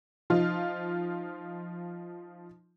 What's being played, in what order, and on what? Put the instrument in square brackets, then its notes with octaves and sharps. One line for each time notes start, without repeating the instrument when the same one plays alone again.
[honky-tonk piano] F3 D#4 F4